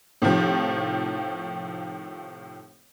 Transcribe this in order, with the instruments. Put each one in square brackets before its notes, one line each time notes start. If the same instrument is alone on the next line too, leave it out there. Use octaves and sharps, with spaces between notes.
[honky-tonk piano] A2 C3 D#3 F3